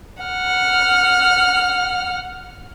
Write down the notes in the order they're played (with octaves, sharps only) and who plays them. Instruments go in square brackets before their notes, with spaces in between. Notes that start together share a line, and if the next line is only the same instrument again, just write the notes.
[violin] F#5 F6